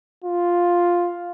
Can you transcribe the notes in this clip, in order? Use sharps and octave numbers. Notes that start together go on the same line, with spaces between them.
F4